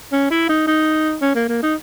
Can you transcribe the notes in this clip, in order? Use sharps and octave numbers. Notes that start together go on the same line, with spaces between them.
C#4
E4
D#4
D#4
C#4
A#3
A#3
D#4